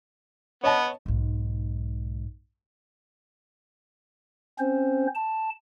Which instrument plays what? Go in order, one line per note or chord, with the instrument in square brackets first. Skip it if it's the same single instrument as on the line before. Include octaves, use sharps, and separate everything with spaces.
[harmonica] B3 [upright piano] C#5 D#5 A5
[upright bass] B1 G#2
[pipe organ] C4 C#4 C5
A5